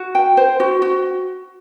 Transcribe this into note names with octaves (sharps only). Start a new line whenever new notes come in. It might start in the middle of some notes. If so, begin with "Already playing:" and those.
Already playing: F#4
G5
C5
F#4
F#4